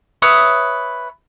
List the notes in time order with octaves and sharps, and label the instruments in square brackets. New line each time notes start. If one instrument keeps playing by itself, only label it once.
[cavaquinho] B4 C#5 E5 D#6